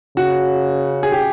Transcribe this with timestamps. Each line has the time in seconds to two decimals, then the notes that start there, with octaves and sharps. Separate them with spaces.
0.16 C#3 F#4
1.03 G#4
1.12 G4